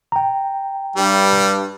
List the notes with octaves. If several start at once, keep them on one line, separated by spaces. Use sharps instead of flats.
G5 A#5
G2 G3